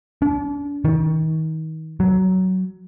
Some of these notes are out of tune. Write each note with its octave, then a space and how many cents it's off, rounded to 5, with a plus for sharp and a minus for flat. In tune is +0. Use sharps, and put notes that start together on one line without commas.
D4 -40
D#3 +30
F#3 +15